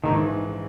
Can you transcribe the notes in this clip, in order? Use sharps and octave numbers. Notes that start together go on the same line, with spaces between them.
A#1 G#2 D#3 E3